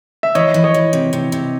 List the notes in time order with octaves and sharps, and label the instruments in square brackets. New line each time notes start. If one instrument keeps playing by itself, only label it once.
[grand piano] E5
[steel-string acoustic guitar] E3 [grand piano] C#5 D#5
[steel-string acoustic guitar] E3
[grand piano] C#5 D#5
[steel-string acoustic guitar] E3
C3
C3
C3